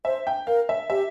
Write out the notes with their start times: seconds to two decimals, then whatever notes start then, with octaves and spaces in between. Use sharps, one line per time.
0.05 C5 E5
0.27 G5
0.47 A#4 F5
0.69 E5
0.90 G4 E5